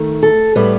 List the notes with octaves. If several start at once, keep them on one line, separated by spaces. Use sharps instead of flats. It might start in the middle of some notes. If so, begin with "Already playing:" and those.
Already playing: D#3 A3
A4
A2 G3 B3 B4